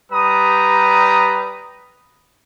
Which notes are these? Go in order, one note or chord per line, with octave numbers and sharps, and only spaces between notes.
G3 B4 A#5 D#6